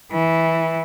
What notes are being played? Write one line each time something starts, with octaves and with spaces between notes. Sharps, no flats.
E3